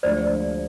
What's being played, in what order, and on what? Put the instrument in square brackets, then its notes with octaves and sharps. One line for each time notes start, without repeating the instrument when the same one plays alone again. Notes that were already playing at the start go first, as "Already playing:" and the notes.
[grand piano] D2 D3 F3 G#3 [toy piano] C5 D5